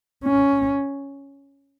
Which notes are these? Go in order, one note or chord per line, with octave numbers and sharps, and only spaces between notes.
C#4